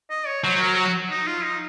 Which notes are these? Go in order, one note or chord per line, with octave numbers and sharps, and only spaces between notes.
D#5
C#5
F#3 C5
C5
A#4
F#4
D#4
F4
D#4